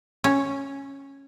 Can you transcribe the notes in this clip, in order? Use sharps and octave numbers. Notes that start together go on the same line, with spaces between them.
C#4